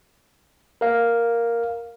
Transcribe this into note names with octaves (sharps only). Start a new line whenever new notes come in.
A#4 F5